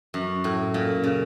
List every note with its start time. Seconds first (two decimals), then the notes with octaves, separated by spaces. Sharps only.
0.14 F#2
0.44 A2
0.74 A#2
1.04 C#3